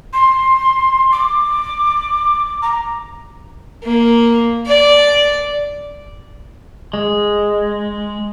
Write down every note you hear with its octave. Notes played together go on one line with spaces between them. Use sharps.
C6
D6
A#5
A#3
D5
G#3